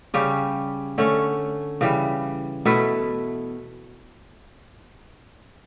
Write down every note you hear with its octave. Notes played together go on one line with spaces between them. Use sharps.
C#3 G3 C#4 G4
D3 A3 C#4
C#3 E3 G3
B2 A3 E4 B4